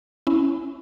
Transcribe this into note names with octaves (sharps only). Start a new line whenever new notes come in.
C#4 E4